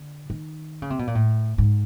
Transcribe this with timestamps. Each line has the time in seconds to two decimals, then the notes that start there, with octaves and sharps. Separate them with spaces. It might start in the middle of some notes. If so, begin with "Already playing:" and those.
Already playing: D3
0.30 D#3
0.82 C#3
0.90 C3
0.99 B2
1.07 A#2
1.15 A2
1.58 G#2